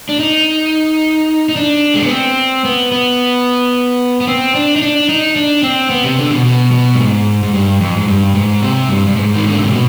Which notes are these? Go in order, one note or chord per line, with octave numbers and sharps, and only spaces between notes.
D4
D#4
D#4
D4
G#3
B3
C4
B3
B3
B3
C4
D4
D#4
D4
D#4
D4
C4
B3
C3
D3
B2
B2
B2
G2
G#2
G#2
G2
F2
G#2
G2
G#2
C3
G2
G2
G#2
D#3
D3
C3
B2